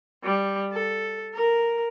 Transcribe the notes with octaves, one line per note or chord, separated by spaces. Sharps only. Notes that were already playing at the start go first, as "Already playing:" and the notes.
G3
A4
A#4